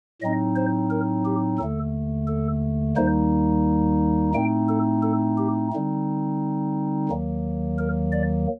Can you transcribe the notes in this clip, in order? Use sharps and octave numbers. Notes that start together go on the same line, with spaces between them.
A2 F#3 C4 D#4 D#5
C5
A#4
G4
D#2 D3 A3 A4
A4
D#2 D#3 G3 A#3 D#4 C5
A2 A3 C4 D#4 G5
A4
A4
G4
D3 G3 C4 D#4
D#2 D#3 F#3 A#3
A#4
D5